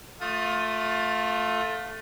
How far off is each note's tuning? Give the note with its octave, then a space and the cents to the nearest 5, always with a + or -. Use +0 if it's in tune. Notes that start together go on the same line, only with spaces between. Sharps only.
A3 +0 F4 +25 D#6 +0